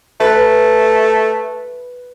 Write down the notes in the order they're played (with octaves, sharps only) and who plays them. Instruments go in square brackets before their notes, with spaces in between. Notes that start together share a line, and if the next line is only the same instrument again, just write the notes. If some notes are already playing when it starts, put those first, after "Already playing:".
[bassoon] A3 [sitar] B4